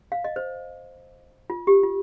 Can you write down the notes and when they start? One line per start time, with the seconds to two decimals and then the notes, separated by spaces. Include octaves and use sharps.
0.12 F5
0.24 D#5
0.36 C5
1.50 F4
1.67 G4
1.83 F4